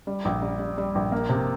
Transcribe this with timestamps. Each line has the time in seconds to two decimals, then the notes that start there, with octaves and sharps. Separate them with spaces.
0.07 G3
0.25 A#1
0.42 G3
0.59 G3
0.78 G3
0.95 A#1
1.12 A#3
1.29 C3